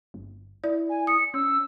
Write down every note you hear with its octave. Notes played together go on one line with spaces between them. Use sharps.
G1
E4 D5
G#5
D#6 C#7
C#4 E6